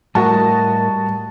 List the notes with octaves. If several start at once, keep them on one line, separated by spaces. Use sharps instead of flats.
A2 G3 F#4 A#4 B4 D#5 A5